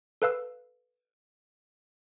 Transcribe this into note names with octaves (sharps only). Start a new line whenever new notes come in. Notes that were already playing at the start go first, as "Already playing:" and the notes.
A4 B4 F5 E6